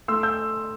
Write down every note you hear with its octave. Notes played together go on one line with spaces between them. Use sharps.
A3 C6 E6
E6 G6